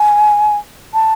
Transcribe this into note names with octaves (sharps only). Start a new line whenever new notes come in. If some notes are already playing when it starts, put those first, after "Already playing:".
Already playing: G#5
A5